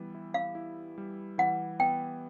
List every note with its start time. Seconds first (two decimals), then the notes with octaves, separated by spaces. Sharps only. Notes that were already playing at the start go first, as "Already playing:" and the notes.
Already playing: E3 G3 B3
0.15 E4
0.34 F5
0.55 E4
0.98 G3
1.38 E3 F#5
1.79 B3 G5